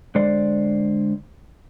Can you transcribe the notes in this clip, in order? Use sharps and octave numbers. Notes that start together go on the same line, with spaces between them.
D3 G#3 C5 D5